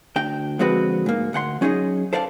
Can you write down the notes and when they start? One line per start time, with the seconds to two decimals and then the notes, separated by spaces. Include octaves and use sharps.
0.16 D2 D4 G5
0.59 D3 F3 G#3 C4 F#4 B4
1.06 G#2 A#3
1.33 D2 F#5 G5 C6
1.61 F#3 C#4 D#4 G#4 D#5
2.13 A4 C5 D5 F5 F#5 A5